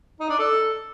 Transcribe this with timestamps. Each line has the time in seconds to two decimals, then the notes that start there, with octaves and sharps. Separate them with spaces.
0.20 D#4
0.30 D4
0.39 A4